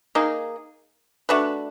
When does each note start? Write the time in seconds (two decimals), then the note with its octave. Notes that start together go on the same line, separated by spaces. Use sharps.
0.15 A#3 D#4 G#4
1.29 A3 D4 F#4 B4